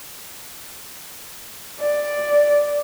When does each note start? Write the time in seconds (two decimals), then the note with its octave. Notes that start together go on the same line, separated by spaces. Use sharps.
1.81 D5